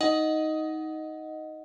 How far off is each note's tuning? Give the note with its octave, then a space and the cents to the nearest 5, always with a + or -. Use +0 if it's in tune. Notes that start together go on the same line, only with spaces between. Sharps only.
D#4 +15 D#5 +0 F#5 +0